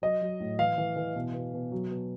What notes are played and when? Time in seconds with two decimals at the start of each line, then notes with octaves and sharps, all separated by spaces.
0.02 F#3 D#5
0.21 F#3
0.40 A2
0.59 E3 F5
0.78 E3
0.96 E3
1.16 B2
1.34 B2
1.54 B2
1.72 F#3
1.91 B2